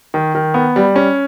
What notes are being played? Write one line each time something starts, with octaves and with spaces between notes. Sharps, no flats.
D#3
D#3
B3
G3
C#4